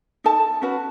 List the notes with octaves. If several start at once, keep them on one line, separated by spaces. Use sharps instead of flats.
D#4 A4 A5
C#4 F#4 B4